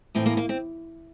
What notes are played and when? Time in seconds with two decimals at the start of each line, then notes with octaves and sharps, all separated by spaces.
0.15 A2 E3 C4
0.26 A#3
0.37 A#3
0.49 C4